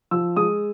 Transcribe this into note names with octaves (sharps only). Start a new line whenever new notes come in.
F3 E6
G#3 D#6